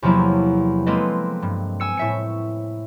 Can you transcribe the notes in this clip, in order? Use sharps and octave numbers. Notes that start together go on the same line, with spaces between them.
E2 C3 F3 F#3 A#3 E4
G#3 A#3 C4 A4 B4 D#5
G2
G#5 E6 C#7
A2 E5 C#7